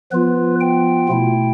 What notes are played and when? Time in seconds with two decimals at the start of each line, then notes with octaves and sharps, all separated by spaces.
0.12 F3 B3 F4 B4
0.61 G5
1.08 B2 A3 E4